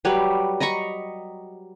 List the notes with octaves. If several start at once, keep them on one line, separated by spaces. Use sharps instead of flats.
F#3 G3 B4 C#5
D#5 A#5 B5 C#6